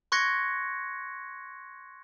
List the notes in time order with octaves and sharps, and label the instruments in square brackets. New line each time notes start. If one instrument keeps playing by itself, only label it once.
[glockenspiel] C6 C#6 F#6 G#6 A#6 C#7